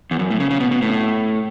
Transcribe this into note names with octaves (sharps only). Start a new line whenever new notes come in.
E2
F#2
A2
C#3
C#3
B2
B2
A2